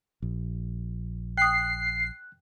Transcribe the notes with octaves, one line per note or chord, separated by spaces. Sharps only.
A#1
G5 D#6 F#6 C7